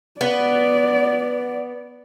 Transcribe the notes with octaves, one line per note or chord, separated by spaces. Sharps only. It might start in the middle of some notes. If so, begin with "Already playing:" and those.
B3 D5